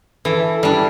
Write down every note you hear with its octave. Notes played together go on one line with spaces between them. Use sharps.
E3 E4 A4
G3 D4 E4 A4